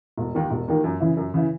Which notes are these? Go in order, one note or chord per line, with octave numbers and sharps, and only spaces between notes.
E1
D#2 D#3 A#3
E1
D#2 D#3 A#3
F#2
C#3 E3
F#2
C#3 E3